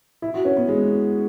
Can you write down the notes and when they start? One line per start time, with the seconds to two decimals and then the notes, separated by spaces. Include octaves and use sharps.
0.22 E4
0.34 F#4
0.45 C#4
0.57 B3
0.68 G#3